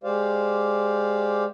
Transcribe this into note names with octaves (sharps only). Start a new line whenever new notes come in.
G#3 G4 C5 D5 F5